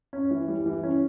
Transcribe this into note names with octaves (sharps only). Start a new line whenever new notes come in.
C#4
E3
G3
E3
C#4